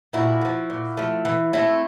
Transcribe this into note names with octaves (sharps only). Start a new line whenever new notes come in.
A#2 E4 F#4
A3
F3
A#2
F3 A3
E3
A3 C4 E4